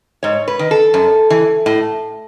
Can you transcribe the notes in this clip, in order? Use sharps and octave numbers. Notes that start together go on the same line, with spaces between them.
G#2 C#5
B4
D#3
A4
F#2
E3
A2